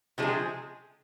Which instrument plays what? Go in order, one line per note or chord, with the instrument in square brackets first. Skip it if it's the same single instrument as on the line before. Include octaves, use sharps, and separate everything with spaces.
[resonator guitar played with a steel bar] C3 F3 G#3 D4 G#4